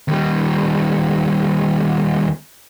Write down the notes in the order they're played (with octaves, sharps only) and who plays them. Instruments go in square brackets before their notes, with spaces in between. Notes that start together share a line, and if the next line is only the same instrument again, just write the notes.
[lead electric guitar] D#2 G3